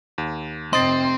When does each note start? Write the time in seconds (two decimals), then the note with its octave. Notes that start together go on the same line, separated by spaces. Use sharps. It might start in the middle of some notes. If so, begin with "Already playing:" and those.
0.18 D#2
0.73 F1 C3 C4 D#5 C6 D#6 A6